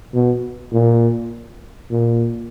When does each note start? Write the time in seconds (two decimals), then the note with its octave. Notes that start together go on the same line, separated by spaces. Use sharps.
0.14 B2
0.72 A#2
1.91 A#2